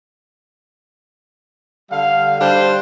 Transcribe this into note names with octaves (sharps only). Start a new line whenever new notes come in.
D3 G3 F5
G3 D4 C5